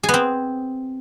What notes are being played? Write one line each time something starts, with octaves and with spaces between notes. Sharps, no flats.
G#4
B3
C4